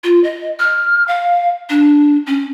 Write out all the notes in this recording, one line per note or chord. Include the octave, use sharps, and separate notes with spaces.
F4
D#5
F6
F5
D4
C#4